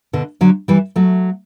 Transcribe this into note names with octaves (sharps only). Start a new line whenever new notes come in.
B2 D3
D3 F#3
E3 G3
F#3 A3